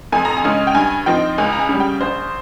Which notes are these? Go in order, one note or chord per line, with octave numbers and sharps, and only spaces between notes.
F2 G#5
A#5
G#5
C#3 G#3 C#4
G5
G2 G#5
F3 C4 D#4 G5
C#2 G#5
A#5
G#5
C#3 G3
G5
A#1 C5